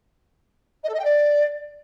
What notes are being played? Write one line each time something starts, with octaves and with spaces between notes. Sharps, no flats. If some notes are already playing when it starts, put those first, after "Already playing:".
D#5
A4
D#5
G5
D5